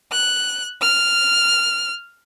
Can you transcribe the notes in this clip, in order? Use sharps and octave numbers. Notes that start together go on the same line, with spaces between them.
F#6
F6